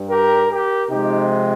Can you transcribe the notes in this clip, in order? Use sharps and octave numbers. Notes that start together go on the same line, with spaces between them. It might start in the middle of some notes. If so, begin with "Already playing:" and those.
Already playing: G2 G3
G4 A#4
G4 A#4
C3 F3 G#3 D#4 G4